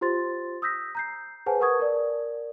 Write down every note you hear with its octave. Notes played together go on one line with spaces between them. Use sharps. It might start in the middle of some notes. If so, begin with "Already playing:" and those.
F4 G4 C5 C6 A6
D#6 E6 G6 A#6 B6
A#5 G6 C7
G#4 B4 C5 F#5 G#5 A5
A#4 B4 F#5 C#6 D#6 G#6
A#4 D5